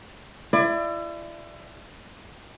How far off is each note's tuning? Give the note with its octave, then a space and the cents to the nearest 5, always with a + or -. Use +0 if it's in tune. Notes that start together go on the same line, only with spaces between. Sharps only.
E4 +35 D5 +25